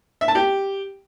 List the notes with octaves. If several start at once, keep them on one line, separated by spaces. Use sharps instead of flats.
E5
A5
G4